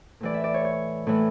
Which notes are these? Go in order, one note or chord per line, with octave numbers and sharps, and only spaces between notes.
A2 E3 D5
E5
D5
C#5
C#5
A2 E3